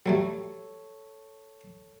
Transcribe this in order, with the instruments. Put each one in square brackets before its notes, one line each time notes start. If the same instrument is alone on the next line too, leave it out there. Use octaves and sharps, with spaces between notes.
[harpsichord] F#3 G3 A3 [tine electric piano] A4 C#5